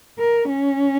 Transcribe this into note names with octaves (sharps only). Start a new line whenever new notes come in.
A#4
C#4